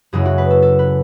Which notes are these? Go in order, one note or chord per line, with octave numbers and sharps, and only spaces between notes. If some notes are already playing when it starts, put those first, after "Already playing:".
F#2 C#3 G#3 C#4 E4 G#4
F#4
B4
A4
A4
B4